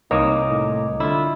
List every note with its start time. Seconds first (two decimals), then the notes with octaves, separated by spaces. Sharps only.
0.11 C2 A#3 D#4 C#5 D#5 D6 D#6
0.48 A2
1.00 D3 E4 F4